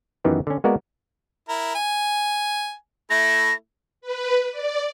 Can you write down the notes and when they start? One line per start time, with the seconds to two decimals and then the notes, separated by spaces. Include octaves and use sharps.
0.24 F#2 D#3 E3 B3 D#4 G4
0.47 D3 C#4
0.64 G#3 A#3 B3 F#4 A#4 D5
1.49 E4 A#4
1.75 G#5
3.10 A3 E4 A#6
4.01 B4
4.51 D5